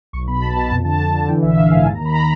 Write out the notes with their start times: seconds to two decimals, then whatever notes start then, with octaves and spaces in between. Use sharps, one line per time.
0.13 B1 C#6
0.27 B2 B5
0.41 B1 A5
0.56 B2
0.70 F2 A5
0.85 D3 A5
1.00 F2
1.14 D3
1.28 E3 G5
1.42 A#1 E5
1.57 A#1 F5
1.71 G#2 G#5
1.86 D#2 A5
1.95 A#5
2.01 D#3 B5
2.15 A#5